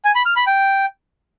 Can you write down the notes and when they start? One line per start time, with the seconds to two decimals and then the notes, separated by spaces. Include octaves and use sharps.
0.05 G#5
0.15 B5
0.26 F6
0.36 B5
0.47 G5